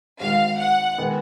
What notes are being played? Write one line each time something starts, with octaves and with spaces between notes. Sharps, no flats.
G#1 G#2 D#3 F5
F#5
D#3 G#3 B3